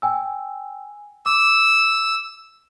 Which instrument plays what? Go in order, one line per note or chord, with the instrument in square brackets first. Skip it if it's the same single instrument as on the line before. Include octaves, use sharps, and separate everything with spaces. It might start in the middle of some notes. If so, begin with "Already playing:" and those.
[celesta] G5 G#5 E6
[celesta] D6 [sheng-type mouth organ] E6